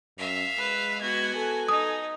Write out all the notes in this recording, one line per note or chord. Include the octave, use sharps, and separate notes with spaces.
F#2 E5 F5
G#3 B4
B3 F#4 G#6
A4 G#5
D#4 D#6